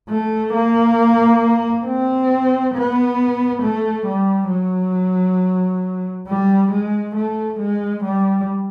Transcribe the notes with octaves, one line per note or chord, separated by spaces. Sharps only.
A3
A#3
C4
B3
A3
G3
F#3
G3
G#3
A3
G#3
G3